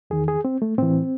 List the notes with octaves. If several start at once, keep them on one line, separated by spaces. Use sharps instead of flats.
E2 D#3 G#4
G#4
C4
A3
A2 E3 C4